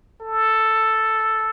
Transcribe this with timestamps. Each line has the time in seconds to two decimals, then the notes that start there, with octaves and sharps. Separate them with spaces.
0.21 A4